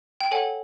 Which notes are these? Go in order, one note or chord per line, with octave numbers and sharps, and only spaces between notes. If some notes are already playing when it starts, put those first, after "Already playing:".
G5
A4 C#5 F#5 G#5